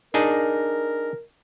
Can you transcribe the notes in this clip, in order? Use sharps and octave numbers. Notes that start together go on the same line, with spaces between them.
D4 D#4 G#4 A#4